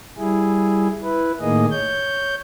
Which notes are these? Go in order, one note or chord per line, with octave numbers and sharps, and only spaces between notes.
G3 E4 G#4
E4 B4
A2 D#3 A#3 G#4 D#5
C#5 G6